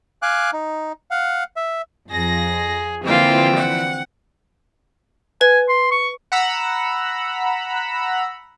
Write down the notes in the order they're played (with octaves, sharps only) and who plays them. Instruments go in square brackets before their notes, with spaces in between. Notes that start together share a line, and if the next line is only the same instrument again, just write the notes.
[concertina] F5 G#5 D6 F#6
D#4
F5 F#5
E5
[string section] F2 A#6 [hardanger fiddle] G#4
[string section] D3 E3 F3 [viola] A#3 F4 [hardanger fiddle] C4 G5
[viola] F#5
[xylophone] B4 [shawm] G#5
[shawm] C6
C#6
[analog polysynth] F#5 A#5 B5 E6